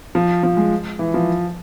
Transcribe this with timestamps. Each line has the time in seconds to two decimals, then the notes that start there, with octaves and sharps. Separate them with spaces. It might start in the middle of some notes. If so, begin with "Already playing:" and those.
0.15 F3
0.43 F3
0.57 G#3
0.99 E3
1.14 F3